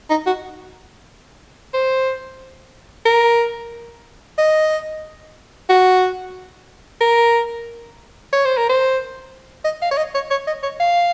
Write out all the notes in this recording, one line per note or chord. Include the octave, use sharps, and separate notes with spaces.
D#4
F#4
C5
A#4
D#5
F#4
A#4
C#5
C5
A#4
C5
D#5
F5
C#5
D#5
C#5
C#5
D#5
C#5
F5